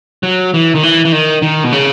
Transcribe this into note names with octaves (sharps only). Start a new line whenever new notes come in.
F#3
E3
D#3
E3
E3
D#3
D#3
B2
C#3